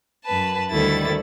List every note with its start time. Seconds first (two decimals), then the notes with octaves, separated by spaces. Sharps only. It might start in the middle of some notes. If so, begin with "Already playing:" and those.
0.24 F#2 B4 A5
0.69 D2 D#3 G3 A3 E4 A6